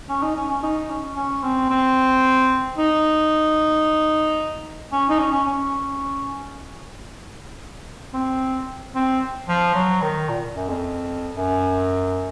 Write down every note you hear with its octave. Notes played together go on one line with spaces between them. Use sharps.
C#4
D#4
C#4
C#4
D#4
C#4
C#4
C4
C4
D#4
C#4
D#4
C#4
C#4
C#4
C4
C4
F3
F#3
D#3
A#2
F#2
F2
F#2